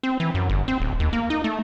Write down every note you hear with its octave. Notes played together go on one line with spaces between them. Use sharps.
C4
E3
F#2
G1
C4
D1
D#2
A#3
D#4
A3